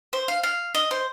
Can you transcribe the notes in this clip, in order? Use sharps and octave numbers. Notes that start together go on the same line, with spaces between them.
C5
F5
F5
D#5
C5